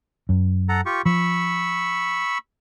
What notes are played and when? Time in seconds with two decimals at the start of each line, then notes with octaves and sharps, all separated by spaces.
0.29 F#2
0.69 A4 F#5 A#5
0.86 F4 G4 C#6
1.06 F3 B5 C#6 E6